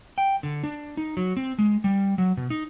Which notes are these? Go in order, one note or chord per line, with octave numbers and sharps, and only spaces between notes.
G5
D3
D4
D#4
F#3
C4
G#3
G3
F#3
B2
D#4